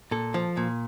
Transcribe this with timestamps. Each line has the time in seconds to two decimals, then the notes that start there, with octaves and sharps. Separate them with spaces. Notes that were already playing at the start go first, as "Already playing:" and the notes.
0.11 A#2 A4
0.34 F3
0.57 A#2